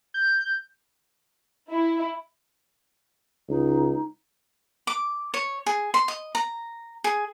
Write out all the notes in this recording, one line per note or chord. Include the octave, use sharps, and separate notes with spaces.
G6
E4
C#2 D#4
D6
C#5
G#4
C6
D#5
A#5
G#4